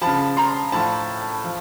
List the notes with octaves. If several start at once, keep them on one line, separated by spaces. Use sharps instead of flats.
C#3 F3 A5 B5
A#5 C6
A2 F3 A5 B5
F3